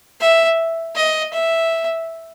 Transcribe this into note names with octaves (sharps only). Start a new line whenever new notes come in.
E5
D#5
E5